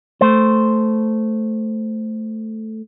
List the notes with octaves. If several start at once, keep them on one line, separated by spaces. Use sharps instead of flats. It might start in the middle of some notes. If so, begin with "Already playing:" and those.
A3 C5